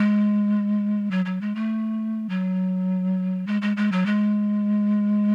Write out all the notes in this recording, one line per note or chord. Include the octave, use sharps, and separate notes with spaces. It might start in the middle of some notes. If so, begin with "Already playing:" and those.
Already playing: G#3
F#3
F#3
G#3
A3
F#3
G#3
G#3
G#3
F#3
G#3